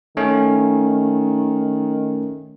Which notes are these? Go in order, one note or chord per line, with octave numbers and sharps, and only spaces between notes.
D#3 A3 C#4